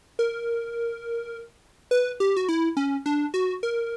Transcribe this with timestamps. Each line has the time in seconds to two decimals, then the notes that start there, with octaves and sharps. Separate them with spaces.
0.19 A#4
1.91 B4
2.20 G4
2.37 F#4
2.49 E4
2.77 C#4
3.06 D4
3.34 F#4
3.63 A#4